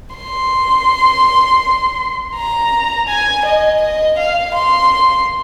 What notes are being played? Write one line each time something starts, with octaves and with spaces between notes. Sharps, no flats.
C6
A#5
G#5
D#5
D#5
F5
C6